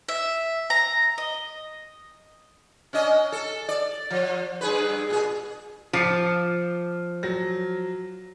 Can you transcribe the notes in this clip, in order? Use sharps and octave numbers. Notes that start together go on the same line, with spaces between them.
E5
A#5
D#5
C#4 D4 D#5
A4
D5
F3
G2 G#4 B4
A#2 G#4
F3 D6 C7 C#7
F#3 A#6